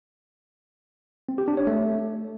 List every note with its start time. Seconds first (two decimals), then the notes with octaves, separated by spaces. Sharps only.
1.29 C4
1.38 G4
1.48 D4
1.57 C#5
1.67 A3